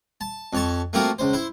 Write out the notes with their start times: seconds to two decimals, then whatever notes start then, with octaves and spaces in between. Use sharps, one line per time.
0.21 A5
0.53 F2 C#5 A5
0.93 A3 A#3 C4 F4 F#4 A#4
1.19 C#2 C5
1.33 E4 C5